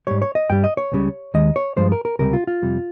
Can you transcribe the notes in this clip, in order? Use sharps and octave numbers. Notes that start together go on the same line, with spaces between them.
G#2 G3 C#5
C#5
D#5
G2 G3 G5
D#5
C#5
C#2 C#3 G3
D#2 D#3 G#3 D#5
C#5
G2 F3 G#3 C5
A#4
A#4
C#2 C3 G3 A#4
F4
F4
F2 C3 G3